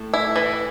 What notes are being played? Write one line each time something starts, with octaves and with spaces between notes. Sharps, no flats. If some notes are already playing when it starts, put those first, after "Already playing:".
Already playing: A2 A3
E4
E3